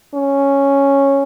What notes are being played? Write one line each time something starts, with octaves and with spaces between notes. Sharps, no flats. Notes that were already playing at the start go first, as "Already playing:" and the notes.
C#4